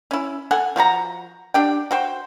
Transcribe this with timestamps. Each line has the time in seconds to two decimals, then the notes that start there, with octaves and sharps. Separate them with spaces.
0.11 C#4 E4
0.51 A4 F#5 G#5
0.76 F3 F4 F#4 A#5
1.54 D4 G4 G5
1.91 F#4 C5 G5